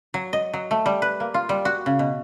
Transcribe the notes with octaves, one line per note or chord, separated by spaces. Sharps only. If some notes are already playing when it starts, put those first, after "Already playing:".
F#3
D#5
F#3
A3
G3
B4
A#3
F4
G3
F#4
C#3
B2